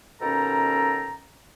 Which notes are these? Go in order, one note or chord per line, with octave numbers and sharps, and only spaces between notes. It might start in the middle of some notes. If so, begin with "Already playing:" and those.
D#2 B2 C#4 A4 G5 A#5